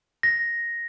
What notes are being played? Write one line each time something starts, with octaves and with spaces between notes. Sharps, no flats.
A#6